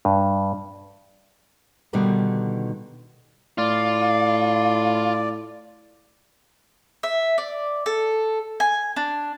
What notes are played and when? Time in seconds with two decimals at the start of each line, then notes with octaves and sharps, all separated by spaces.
0.05 G2
1.93 B2 D3 D#3 G3 A3 B3
3.58 A2 F4 D5
7.03 E5
7.38 D5
7.86 A4
8.60 G#5
8.96 D4